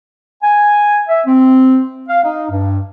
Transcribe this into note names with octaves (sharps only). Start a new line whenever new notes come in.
G#5
E5
C4
F5
D#4
G2